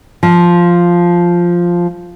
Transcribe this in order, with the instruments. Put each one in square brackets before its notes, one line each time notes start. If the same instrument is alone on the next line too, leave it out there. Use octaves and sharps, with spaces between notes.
[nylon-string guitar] F3